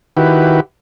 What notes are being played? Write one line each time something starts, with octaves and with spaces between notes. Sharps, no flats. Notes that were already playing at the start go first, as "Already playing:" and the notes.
D#3 E4 F#4 G4 B4